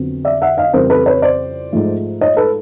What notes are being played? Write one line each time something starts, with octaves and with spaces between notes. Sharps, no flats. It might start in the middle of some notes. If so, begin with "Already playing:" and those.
Already playing: F2 D3 F#3 B3
D5 E5
E5 F#5
D#5 F5
F2 C#3 E3 G3 A#4 C5
A4 B4
B4 C#5
C5 D5
G#2 F3 A3
C#5 D#5
A4 B4